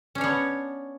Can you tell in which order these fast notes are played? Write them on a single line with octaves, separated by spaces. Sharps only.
C#4 D4 C#5 B3